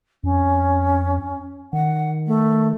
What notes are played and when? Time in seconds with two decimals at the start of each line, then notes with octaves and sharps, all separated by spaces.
0.24 F2 C#4
1.73 D#3 F#5
2.27 A3